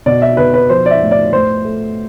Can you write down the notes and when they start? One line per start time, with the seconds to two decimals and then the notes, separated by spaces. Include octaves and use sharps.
0.06 B2 D5
0.22 E5
0.37 B2 B4
0.54 B4
0.70 F3 C5
0.86 D5
0.91 E5
1.02 A2
1.11 D5
1.33 A2 C5
1.65 A3